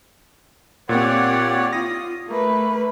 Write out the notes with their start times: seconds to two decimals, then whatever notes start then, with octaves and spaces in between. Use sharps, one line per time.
0.89 A#2 C4 G4 C#5 D5 F#5
1.73 F4 D#6 A#6
2.28 A3 A#3 B4